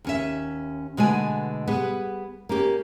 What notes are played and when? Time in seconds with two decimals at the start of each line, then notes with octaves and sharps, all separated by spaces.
0.05 D#2 C#4 E5
0.97 B2 D3 G#3 A3 B3 G#5
1.67 G3 B3 G#4 B4
2.49 A#3 C#4 G4